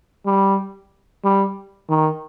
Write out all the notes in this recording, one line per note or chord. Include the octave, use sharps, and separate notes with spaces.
G3
G3
D#3